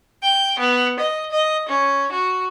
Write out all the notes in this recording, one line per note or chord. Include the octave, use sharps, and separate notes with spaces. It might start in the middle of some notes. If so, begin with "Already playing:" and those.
G5
B3
D#5
D#5
C#4
F#4